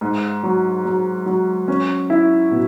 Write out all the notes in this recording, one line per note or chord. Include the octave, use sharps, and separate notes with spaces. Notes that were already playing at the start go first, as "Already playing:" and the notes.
G#2
F#3
F#3
F#3
C#4
E4
B2